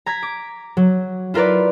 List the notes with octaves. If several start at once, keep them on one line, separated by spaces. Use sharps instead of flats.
A#5 G#6 B6
D6
F#3
E4 F4 A#4 B4 D5